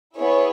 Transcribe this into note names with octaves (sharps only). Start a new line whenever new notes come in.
B3 E4 G#4 C#5